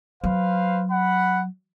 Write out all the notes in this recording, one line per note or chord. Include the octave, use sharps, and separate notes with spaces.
F#3 B4 C5 F5
F#5 B5